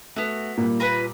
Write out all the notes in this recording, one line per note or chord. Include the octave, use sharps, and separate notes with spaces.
A3 B3 F#4
A#2 G3 A#3
F4 B4 G#5 A#5 B5